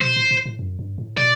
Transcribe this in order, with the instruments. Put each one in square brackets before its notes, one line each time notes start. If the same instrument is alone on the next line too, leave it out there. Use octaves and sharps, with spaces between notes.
[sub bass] B2 [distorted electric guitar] C5
[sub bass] A2
A2
A2
F#2
G2
A2
[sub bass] B2 [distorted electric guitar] D5